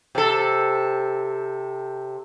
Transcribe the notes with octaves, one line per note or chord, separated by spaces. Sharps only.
C3 A4